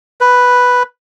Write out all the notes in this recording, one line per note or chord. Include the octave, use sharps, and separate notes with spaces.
B4